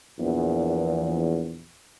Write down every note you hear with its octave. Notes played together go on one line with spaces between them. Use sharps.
A#1 E2